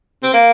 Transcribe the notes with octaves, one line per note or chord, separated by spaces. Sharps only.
C4
A#3